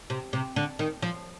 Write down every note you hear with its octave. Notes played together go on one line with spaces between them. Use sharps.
C3
C3
D3
D#3
F3